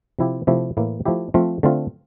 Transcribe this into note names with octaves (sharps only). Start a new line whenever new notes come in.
C3 F3 C4 E4 G4
C3 F3 A3 E4 G4
A2 E3 A#3 E4
F3 A3 E4 G4
F3 A3 C4 F4
D3 A3 C4 F4